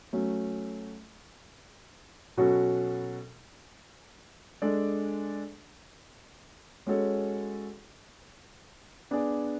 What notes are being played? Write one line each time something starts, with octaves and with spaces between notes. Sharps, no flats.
F#3 A3 C#4
B2 F#3 C#4 F#4 A4
G#3 D4 A4 D5
G#3 C#4 F#4 A4 C#5
B3 D4 G#4 D5